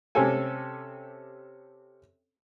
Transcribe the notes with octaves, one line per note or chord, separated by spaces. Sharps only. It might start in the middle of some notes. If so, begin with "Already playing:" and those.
C3 C4 C#4 G4 A4 G#5